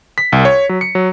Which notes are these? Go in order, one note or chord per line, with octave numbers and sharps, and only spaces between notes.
B6
C2
C#5
F#3
C#7
F#3